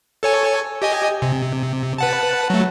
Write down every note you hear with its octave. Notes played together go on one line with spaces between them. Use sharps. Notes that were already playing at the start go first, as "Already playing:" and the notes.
A4 C#5 G#5
G4 D#5 G#5
C3
B4 F#5 A5
F#3 A3